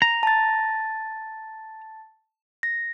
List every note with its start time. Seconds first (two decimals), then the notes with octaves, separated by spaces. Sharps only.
0.02 A#5
0.23 A5 A6
2.63 A#6